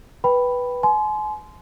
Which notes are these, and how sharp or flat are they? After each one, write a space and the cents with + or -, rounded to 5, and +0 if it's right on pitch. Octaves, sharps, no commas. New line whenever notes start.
B4 -5 G5 +0 B5 +0
G#5 +40 C6 -15